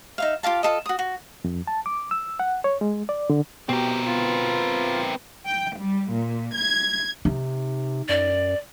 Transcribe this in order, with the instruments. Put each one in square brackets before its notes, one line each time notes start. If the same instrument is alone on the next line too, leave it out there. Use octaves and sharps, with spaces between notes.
[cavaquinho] D#4 E5 F5
F4 G4 F5 A5
F4 A4 D#5
F#4 D#6
F#4
[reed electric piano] F2
A5
D6
E6
F#5
C#5
G#3
D5
D3
[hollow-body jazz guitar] B2 [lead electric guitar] C4 A#4 [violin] G4
[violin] B3 [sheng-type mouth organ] F4
[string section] G5
G3
A#2
G#6
[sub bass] C3 [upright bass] D#4
[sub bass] F#2 [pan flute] D5